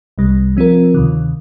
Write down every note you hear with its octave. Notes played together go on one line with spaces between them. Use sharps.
C2 C3 G3
F3 C4 F4 A#4
D2 C3 D#3